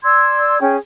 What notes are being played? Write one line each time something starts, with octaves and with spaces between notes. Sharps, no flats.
D5 C6 E6 G#6
C#4 G#4 G5